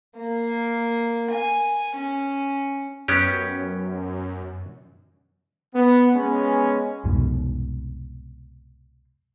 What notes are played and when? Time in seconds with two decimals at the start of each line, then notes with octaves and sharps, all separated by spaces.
0.17 A#3
1.31 G#5
1.97 C#4
3.08 F#2 B3 C#4 G4
5.74 B3
6.15 G#3 B3 C#4
7.04 C2 F2 G#2 B2